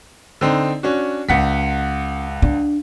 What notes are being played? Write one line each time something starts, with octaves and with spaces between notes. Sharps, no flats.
D3 C4 D#4
C#4 D4 F#4
C#2 C#4 F#5 B6
D4